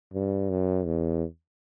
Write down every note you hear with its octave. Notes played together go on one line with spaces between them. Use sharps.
G2
F#2
E2